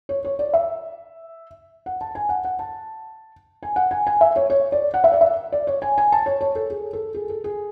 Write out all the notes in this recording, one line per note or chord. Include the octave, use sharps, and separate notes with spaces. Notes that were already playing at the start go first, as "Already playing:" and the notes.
C#5
C#5
D5
E5
F#5
A5
G#5
F#5
F#5
A5
G#5
F#5
G#5
G#5
E5
C#5
C#5
D5
F#5
E5
D5
E5
D5
C#5
G#5
G#5
A5
C#5
C#5
A4
G#4
A4
G#4
A4
G#4